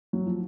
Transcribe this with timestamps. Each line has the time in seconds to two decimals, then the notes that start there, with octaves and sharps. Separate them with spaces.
0.13 F#3
0.26 F3